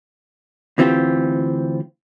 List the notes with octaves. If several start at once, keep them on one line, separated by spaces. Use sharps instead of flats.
D2 E3 C4 F4 G4